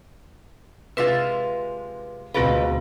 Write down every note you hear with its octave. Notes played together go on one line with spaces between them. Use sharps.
C3 G#3 F4 B4 B6
D2 B2 C4 F4 G#4 B4 F5